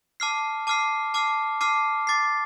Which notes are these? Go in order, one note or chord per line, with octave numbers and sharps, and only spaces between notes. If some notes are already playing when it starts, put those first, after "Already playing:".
A5 D6 F6 C7
A5 D6 F6 C7
A5 D6 F6 C7
A5 D6 F6 C7
D6 A6 C7